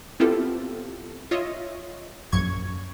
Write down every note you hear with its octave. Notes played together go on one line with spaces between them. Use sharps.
B3 C4 E4 F4 G4 A4
F4 C#5 D#5 E5
A#1 F#2 C#6 G#6